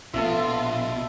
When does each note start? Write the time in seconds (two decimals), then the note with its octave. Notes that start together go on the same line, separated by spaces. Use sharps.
0.14 A#1 B2 F4 A4 E5